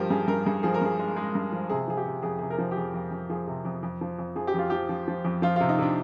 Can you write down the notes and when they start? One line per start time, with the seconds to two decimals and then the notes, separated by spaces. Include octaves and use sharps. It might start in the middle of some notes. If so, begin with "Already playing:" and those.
Already playing: G2 F3 G4 A#4
0.10 G2 G#4
0.28 G2 A#4
0.45 G2 G#4
0.63 F3 G#4
0.74 A#4
0.82 G2 G#4
0.99 G#3
1.16 G#3
1.35 G2
1.52 F3
1.70 C3 G#4
1.88 F3 G#4
1.97 G4
2.06 C3
2.23 F2 G#4
2.39 C3 G#4
2.50 A#4
2.58 F3
2.71 G4
2.77 F2 G#4
2.94 F2
3.12 F2
3.30 F3 G#4
3.47 C3
3.65 F2
3.83 F2
4.01 F3
4.19 F2
4.36 F3 G#4
4.47 G4
4.54 F2 F4
4.70 F3 G4
4.89 F3
5.08 F3
5.25 F2
5.42 F3 F4
5.56 F4
5.60 C3
5.69 D#4
5.79 C3 D4